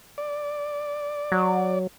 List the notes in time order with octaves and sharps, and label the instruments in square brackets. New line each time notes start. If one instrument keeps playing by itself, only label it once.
[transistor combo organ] D5
[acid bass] F#3